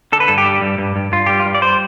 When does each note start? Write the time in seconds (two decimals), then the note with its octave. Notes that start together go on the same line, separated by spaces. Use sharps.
0.12 D3 A4
0.20 B4
0.28 G2 A4
0.38 G4
0.46 G3
0.62 G2
0.78 G2
0.96 G2
1.12 G2 F4
1.26 G3 G4
1.40 F4
1.46 G3
1.55 D5
1.62 G3 C5